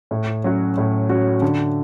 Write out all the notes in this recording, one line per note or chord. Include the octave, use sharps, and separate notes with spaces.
A2
F#3 C#4 F#4
A2
F#3 C#4 F#4
D3